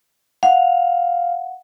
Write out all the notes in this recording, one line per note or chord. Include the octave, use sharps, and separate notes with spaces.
F5 F#5